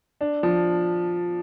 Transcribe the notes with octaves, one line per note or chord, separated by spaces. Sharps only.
D4
F3